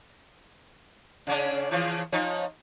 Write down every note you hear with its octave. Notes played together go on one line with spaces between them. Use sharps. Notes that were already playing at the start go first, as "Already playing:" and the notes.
C#3 C#4 D4
C#3 E3 F3
F3 C#4 D#4